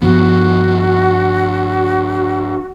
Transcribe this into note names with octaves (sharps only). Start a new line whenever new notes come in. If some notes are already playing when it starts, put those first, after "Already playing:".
G2 F3 B3 F#4